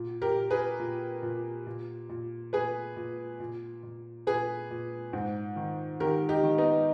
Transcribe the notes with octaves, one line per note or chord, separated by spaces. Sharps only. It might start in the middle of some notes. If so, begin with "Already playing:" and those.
Already playing: A#2
G4 A#4
A#2
G#4 B4
A#2
A#2
A#2
A#2
A#2 G#4 B4
A#2
A#2
A#2
A#2 G#4 B4
A#2
G#2
D#3
D#3 G4 A#4
D#4 G4
D#3
B3 D#4